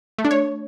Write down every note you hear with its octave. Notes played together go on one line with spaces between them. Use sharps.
A3
D4
C#5